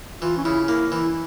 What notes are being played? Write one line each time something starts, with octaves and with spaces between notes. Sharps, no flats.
E3 F4
C#4
C#3 E4
A#3 E4
E3 E4